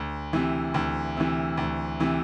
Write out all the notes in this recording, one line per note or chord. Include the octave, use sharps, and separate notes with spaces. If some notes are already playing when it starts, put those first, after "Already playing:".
Already playing: D2
C3 E3
D2
C3 E3
D2
C3 E3